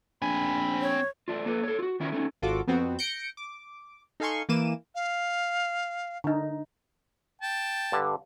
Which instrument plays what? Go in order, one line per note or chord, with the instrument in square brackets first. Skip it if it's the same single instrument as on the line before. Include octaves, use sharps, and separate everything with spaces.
[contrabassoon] A#1 [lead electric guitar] C4 G#5 [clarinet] B5
[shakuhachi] C#5
[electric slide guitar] A3 D4 F4
A#3 A4 B4
A4 C#5
F4 F#4
D#3 C#4 E4 F4 G4 A#4
A3 C#4 D#4
[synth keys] G#1 F4 F#4 A4 D6
F2 B3 C4 F#4
G6 A#6 C#7 D7
D6
D#4 A4 F5 G#5 C6 C#6
E3 A#3 D6 D#7 E7
[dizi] F5
[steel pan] D3 D#4
[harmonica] G5 A5
[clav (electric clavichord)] G2 D3